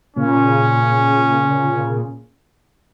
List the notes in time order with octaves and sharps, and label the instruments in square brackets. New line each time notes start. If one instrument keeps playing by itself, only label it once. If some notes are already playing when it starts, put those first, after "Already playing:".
[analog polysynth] A#2 C#3 [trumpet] C#4